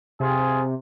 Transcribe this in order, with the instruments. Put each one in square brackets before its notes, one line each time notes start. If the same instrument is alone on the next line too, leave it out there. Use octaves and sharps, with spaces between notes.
[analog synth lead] C3 [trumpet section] F4 G#4